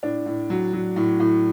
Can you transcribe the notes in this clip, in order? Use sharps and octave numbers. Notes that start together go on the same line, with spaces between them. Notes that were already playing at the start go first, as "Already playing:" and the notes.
A2 D4
A2
F#3
F#3
A2
A2